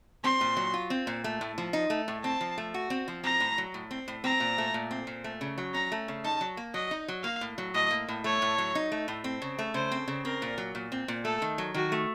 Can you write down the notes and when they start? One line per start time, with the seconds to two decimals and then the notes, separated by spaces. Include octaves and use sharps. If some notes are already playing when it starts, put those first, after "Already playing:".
0.24 C4 C6
0.41 A#2
0.57 F#3
0.74 F4
0.90 C4
1.07 A#2
1.24 A3
1.41 A2
1.58 F3
1.73 D#4
1.90 A3
2.08 A2
2.24 C4 A5
2.41 F3
2.58 A3
2.74 F#4
2.90 C4
3.08 F3
3.23 C4 A#5
3.40 A2
3.58 F#3
3.74 A2
3.91 C4
4.08 A2
4.24 C4 A#5
4.40 A#2
4.58 A3
4.74 A#2
4.91 C4
5.07 A#2
5.24 A3
5.41 C#3
5.58 F#3
5.74 C#4 A#5
5.92 A3
6.08 C#3
6.24 D#4 A5
6.41 F#3
6.57 A#3
6.74 F#3 D#5
6.91 D#4
7.08 F#3
7.24 A#3 F5
7.41 A2
7.58 F#3
7.74 A2 D#5
7.91 A#3
8.08 A2
8.24 A3 C#5
8.42 A2
8.58 F#3
8.75 D#4
8.92 A3
9.08 A2
9.24 C4
9.42 C#3
9.58 A3
9.74 C#3 C5
9.91 C4
10.08 C#3
10.25 C4 A#4
10.42 A#2
10.58 F#3
10.75 A#2
10.92 C4
11.08 A#2
11.25 A3 A4
11.42 D#3
11.58 F#3
11.74 D#3 F#4
11.92 A3